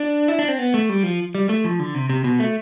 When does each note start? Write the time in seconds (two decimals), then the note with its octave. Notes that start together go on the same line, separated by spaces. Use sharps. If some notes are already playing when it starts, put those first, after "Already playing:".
Already playing: D4
0.28 E4
0.39 D4
0.48 C4
0.59 B3
0.74 A3
0.89 G3
1.03 F3
1.35 G3
1.49 A3
1.64 F3
1.79 D3
1.94 C3
2.10 C3
2.24 B2
2.40 A3